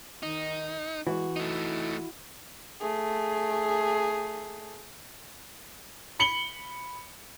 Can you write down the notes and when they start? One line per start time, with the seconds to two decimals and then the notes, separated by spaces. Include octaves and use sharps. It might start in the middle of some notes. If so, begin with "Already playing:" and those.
0.23 D#3 D#4
1.07 E3 G#3 F#4
1.36 A3 D#4 E4
2.80 A3 G#4
6.19 B5 C#7 F#7 G7